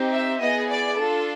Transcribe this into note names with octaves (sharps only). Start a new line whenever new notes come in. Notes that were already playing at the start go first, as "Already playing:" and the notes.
Already playing: C4 D#4 G4
E5
B3 E4 G#4 D#5
D5
D4 F4 A4